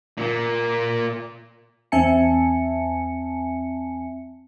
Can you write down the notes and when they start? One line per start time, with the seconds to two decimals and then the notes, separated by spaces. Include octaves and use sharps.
0.17 A#2 A#3
1.92 E2 C4 E5 G#5 A5 C#7